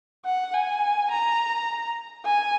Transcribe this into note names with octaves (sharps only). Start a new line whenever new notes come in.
F#5
G#5
A#5
G#5